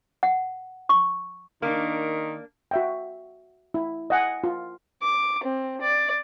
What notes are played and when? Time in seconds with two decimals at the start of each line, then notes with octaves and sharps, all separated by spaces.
0.23 F#5
0.89 C#6
1.62 D#3 A#3 D4
2.71 F#4 E5 G5
3.74 E4
4.10 D#5 F#5 G#5
4.44 F4
5.02 D6
5.44 C4
5.81 D5